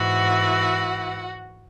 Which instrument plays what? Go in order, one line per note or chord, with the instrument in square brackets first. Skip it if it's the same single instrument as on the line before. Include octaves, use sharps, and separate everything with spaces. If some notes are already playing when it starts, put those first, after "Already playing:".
Already playing: [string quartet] G#2 E3 F#4 F#5